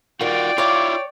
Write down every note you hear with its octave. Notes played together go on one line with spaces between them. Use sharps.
D#3 G3 F4 F#4 D5 G5
E4 F4 C#5 F5 D6